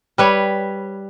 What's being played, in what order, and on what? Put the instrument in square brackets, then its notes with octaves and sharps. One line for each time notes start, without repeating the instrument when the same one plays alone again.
[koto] G3 B4 C#5